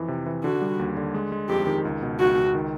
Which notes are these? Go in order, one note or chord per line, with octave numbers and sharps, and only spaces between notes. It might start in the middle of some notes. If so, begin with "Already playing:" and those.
Already playing: F2 E3
C3
E3
D3 F#4
G3
D#2
D3
G#3
G#3
F2 G4
D#3
C#2
B2
C#2 F#4
C#2
D#3